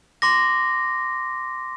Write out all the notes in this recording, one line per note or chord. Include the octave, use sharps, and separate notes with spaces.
C6 D6 A#6